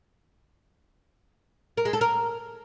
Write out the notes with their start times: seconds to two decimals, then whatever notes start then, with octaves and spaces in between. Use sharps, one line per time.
1.77 A#4
1.85 G#3
1.93 A4
2.01 A#4